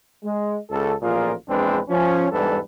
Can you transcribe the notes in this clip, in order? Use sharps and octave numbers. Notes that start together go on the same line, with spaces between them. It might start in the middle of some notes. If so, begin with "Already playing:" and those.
G#3
C#2 C#3 A4
A1 A#2 F3 F4 G#4 A#4
A#1 E2 G#3 C4 D4 B4
F3 C#4
E2 G#2 G3 D4 A4 B4